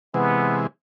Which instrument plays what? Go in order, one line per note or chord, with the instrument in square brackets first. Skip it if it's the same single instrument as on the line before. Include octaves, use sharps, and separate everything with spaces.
[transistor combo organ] C3 E3 G#3 [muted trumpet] B3